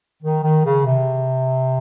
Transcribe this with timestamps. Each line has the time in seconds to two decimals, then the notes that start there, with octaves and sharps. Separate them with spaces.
0.23 D#3
0.44 D#3
0.65 C#3
0.85 C3